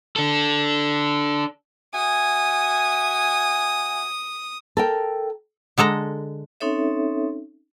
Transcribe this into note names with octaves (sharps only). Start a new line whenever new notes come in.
D4 A4
F#4 E5 G#5 D#6
A4 A#4 G5
D3 G#3 A4 A#5
C4 C#4 D#4 A4 C#5 E5